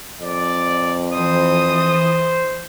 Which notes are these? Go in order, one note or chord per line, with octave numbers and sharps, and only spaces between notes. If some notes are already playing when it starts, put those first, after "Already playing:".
F2 D5
E3 C5 D#6